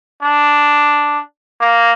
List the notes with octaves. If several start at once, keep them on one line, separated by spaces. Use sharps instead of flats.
D4
A#3